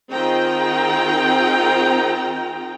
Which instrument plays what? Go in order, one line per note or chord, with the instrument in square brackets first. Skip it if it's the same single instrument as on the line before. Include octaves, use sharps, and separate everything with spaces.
[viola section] D#3 C4 F4 G#4 G5 A#5